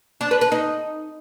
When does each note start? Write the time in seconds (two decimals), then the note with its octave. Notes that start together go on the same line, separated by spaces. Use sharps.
0.21 D4
0.31 B4
0.41 B4
0.52 D#4